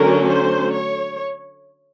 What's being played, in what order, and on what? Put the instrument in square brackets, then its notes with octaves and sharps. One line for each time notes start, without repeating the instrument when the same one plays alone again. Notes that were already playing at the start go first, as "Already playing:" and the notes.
Already playing: [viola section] D3 F#3 A3 C#4 A#4
C5
C#5